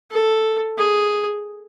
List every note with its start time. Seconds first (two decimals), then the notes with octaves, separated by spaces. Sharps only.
0.11 A4
0.78 G#4